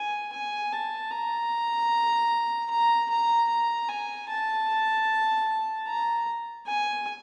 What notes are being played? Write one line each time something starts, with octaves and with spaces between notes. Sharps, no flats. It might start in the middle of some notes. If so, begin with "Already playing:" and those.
Already playing: G#5
G#5
A5
A#5
A#5
A#5
A#5
G#5
A5
A#5
G#5